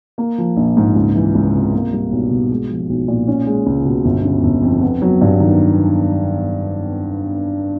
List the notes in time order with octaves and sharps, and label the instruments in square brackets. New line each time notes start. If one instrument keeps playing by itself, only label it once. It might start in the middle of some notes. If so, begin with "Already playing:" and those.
[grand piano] A#3
F3
A#1
G#2
C#2
E3
C#2
C3
A#3
G3
B1
B2
G#3
F3
B1
A#2
C#4
G#3
C#2
B2
G1
C#3
G1
F2
B3
F#3
G2
D#3